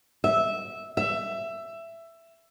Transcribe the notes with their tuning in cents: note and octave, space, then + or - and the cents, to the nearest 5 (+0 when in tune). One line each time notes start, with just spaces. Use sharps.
E5 -10
E5 +15